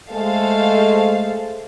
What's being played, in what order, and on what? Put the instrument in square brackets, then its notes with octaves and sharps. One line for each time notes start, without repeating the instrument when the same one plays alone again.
[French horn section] G#3 A3 [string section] A4 C5 F5